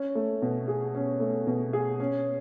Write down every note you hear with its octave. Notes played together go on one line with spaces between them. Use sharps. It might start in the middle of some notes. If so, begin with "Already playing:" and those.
Already playing: C#4
A3
B2
G#4
C#4
A3
B2
G#4
C#4